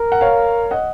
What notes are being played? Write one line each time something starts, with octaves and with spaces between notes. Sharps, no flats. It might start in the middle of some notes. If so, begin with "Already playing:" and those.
Already playing: A#4
F#5
C#5 F5
D#5 F#5